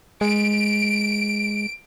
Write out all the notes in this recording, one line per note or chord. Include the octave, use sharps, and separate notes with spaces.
G#3 D7